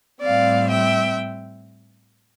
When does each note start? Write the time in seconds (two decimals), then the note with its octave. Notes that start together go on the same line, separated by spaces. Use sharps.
0.22 A2 G3 C4 D5 F5
0.69 E5 G5